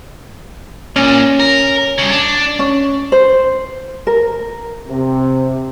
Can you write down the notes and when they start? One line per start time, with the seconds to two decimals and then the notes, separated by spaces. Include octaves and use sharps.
0.96 A#2 C#4
1.40 A#4
1.98 G2 C#3
2.11 D4
2.59 C#4
3.12 C5
4.07 A#4
4.88 C3